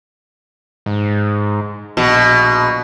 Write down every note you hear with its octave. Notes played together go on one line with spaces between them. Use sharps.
G#2
A#1 B2